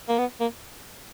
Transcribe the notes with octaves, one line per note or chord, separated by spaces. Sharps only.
A#3
B3
A#3